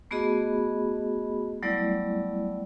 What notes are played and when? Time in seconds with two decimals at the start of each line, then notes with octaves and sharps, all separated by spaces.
0.11 A3 B3 F#4 G#4 D#5 B5
1.63 F#3 G3 A3 B3 E4 D5